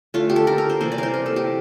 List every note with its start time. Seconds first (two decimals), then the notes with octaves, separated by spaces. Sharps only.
0.14 D3 A3 F4
0.30 G4
0.36 A4
0.47 A#4
0.58 A#4
0.70 C5
0.80 C3 E3 G3 A#3 C5
0.92 D5
0.98 A#4 C5
1.14 A#4
1.26 A4
1.36 G4